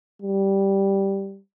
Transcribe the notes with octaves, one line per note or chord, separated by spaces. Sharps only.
G3